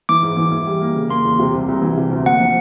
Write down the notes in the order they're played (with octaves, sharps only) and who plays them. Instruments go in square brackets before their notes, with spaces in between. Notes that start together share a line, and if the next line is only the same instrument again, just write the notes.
[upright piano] E3 [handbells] D6
[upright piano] G#2
E3
E3
G3
A#3
C#3
[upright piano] A#3 [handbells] C6
[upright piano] E2
C3
C2
C2
E3
C3
D2
[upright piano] A#3 [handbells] F#5
[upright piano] F3